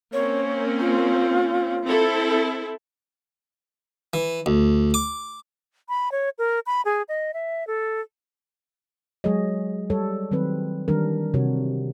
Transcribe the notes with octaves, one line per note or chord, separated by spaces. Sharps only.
A#3 C4 C#4 C#5
F4
C4 E4 A4
E3
D2
D6
B5
C#5
A#4
B5
G#4
D#5
E5
A4
F#3 G#3 G#4 C#5 D#5
G3 A4 C#5
D#3 F#3 C4 B4
D#3 E3 G3 D4 A#4
C3 F#4 C#5